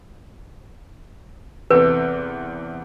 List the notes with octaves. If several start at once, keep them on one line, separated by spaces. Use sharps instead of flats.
E2 C3 A4 B4